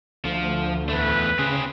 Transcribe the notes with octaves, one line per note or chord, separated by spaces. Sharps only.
D2 F3
E2 A3 B4
C#3 C4 G#4